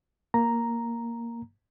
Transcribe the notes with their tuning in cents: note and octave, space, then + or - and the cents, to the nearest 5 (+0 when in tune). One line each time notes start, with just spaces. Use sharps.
A#3 +0 A#5 +0